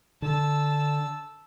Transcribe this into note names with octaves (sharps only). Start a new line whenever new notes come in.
D3 A5 E6